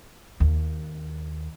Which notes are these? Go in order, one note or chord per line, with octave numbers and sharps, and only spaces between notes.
D#2